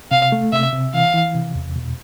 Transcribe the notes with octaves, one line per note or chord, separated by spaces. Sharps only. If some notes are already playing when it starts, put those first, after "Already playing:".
C3 F5
A3
C3 E5
C3
E3 F5
E3
C3
E2
B2